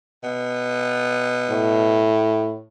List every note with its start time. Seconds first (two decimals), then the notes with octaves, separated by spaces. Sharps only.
0.23 B2
1.50 A2